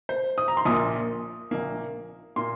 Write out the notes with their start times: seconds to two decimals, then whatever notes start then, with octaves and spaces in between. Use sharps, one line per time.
0.09 C5
0.38 D#6
0.48 A#5
0.57 C6
0.65 A#1 A#2 A#3 D#6
1.51 A#1 A#2 A#3
2.36 A#2 A#3 C6